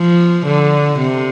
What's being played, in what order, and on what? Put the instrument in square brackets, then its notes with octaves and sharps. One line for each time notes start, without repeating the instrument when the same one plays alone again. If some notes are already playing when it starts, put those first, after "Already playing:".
Already playing: [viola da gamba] F3
D3
C3